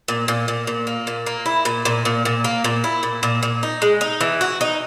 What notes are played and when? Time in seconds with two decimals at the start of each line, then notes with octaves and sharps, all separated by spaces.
0.08 A#2
0.28 A#2
0.48 A#2
0.67 A#2
0.87 A#3
1.07 A#2
1.26 A#3
1.46 E4
1.65 A#2
1.85 A#2
2.05 A#2
2.25 A#2
2.44 A#3
2.64 A#2
2.84 E4
3.03 A#2
3.23 A#2
3.43 A#2
3.63 D#4
3.82 G#3
4.01 D#4
4.21 E3
4.41 F#4
4.61 D#4